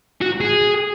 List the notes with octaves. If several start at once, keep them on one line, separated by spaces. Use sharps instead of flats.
F#4
G#4